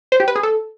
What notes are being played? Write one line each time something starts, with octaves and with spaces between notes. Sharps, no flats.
C5
G4
B4
G#4
A4